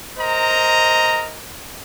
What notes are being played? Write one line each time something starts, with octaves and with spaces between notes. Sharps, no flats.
A#4 C5 D#5 A#5